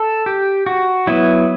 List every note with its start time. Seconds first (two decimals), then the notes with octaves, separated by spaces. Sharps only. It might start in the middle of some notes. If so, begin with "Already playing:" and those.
Already playing: A4
0.26 G4
0.66 F#4
1.07 F#3 B3 E4